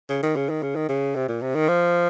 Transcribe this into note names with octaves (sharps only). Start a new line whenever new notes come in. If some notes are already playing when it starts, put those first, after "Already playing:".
C#3
D#3
C#3
D#3
C#3
D#3
C#3
C3
A#2
C3
D#3
F3